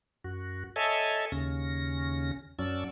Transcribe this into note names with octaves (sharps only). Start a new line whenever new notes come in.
F#2 F#4
A4 C#5 D#5 E5 G#5 A5
D#2 C#3 C#4 A#6
F#2 F#3 C#4 D5 A5 E6